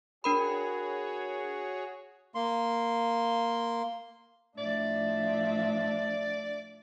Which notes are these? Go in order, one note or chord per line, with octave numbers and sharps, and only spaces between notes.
D4 F#4 G#4 A#4 C#5 B5
A#3 C6
A2 F3 D4 D5 E5